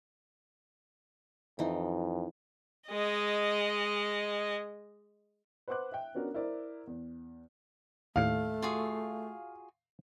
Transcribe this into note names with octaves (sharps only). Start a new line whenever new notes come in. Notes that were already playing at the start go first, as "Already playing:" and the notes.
F2 E3 D#4
G#3 D#5
B4 C5 F#5 C6 D6 F#6
E5 G5
B3 C#4 D4 F#4 A#4
E4 A#4 C5 D5
E2
D#2 A2 A3 F5
F4 F#4 G#4